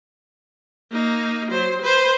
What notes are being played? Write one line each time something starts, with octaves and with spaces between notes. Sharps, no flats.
A#3 D#4
F#3 C5
B4 C5